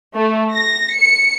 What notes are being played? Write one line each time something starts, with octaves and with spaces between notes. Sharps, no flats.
A3
A#6
C#7